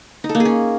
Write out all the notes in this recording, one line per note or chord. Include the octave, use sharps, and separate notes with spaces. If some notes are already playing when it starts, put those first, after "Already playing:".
D#4
A4
A#3
G#4
C#4